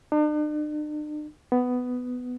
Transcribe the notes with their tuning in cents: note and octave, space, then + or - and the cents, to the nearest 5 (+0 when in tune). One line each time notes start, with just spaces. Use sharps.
D4 +45
B3 +10